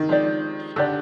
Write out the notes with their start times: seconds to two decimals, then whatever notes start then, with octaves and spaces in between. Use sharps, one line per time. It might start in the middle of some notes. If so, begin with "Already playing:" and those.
Already playing: D#3
0.09 F3 G#3 C4 G4 D5
0.76 D3 D4 G4 D5